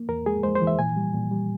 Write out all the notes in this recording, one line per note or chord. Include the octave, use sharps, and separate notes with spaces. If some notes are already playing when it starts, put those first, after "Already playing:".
Already playing: A#3
E2 A#4
G#3 G#4
G#3 C5
C5
E3
E5
A#2 G#5
G3
A#2
G3